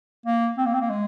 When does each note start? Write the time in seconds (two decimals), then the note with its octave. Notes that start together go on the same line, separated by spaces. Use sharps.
0.25 A#3
0.57 C4
0.65 A#3
0.74 C4
0.81 A#3
0.90 G#3